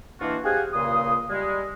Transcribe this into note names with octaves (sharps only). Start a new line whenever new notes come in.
B2 E3 A#3 D4 F4 F#4
G4 G#4 C5 F5 F#5 G#5
C#2 A#2 C#3 A#3 C6 D#6
G3 G#3